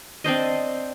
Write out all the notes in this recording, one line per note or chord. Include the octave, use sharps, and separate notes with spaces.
C4 D4 C5 D#5